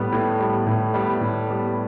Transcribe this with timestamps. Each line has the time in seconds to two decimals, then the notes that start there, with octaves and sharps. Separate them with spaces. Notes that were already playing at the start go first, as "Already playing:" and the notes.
Already playing: A2 G3 B3
0.12 A2
0.39 G3 B3
0.67 A2
0.94 G3 B3
1.21 A2
1.48 G3 B3